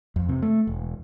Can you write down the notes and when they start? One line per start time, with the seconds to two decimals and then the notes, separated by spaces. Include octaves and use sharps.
0.16 F2
0.29 C3
0.43 A3
0.67 E1